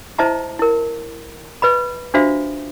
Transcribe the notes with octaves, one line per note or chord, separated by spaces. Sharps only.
E4 C5 D#5 E5 A5 A#5
E4 A#4
B4 D#5 B5
D4 F4 F#4 C5 E5 F5